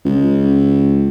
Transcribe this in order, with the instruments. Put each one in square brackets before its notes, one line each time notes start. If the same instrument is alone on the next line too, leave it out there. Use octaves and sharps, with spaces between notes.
[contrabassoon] C#2